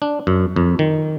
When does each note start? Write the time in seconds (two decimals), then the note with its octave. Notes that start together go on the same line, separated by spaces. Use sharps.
0.02 D4
0.27 F#2
0.56 F2
0.79 D#3